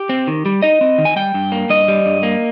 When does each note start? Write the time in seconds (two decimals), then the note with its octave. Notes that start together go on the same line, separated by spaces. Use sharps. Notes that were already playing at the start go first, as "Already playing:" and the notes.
Already playing: G4
0.09 C4
0.27 D#3
0.46 G3
0.62 D#4 D#5
0.81 C4
0.98 D#3
1.05 G#5
1.16 G3 G5
1.34 G2
1.52 A#3
1.70 G2 D#5
1.88 G3
2.06 G2
2.23 A#3